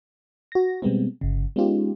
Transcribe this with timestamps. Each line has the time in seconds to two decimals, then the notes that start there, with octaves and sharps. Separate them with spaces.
0.52 F#4 A#6
0.82 B2 G3 G#3 B3 C4
1.21 G1 C#3
1.56 G#3 B3 C#4 D#4 F4 G4